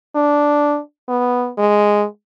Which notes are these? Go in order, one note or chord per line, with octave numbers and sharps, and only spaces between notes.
D4
B3
G#3